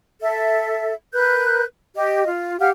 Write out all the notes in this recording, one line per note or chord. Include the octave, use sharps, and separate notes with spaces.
A4 E5
A#4 B4 F#6 G6
G4 D#5
F4
G4 F5 F#5 F6